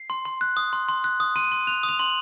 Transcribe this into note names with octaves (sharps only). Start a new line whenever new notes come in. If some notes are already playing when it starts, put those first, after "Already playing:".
Already playing: C7
C6
C6
F#6
D#6
C6
C6
F#6
D#6
C6 D#7
C6
F#6 F7
D#6
F7
C6 F#7